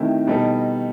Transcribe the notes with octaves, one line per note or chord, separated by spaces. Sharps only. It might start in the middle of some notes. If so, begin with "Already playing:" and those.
Already playing: C3 D#3 A3 E4
B2 G3 D#4 A4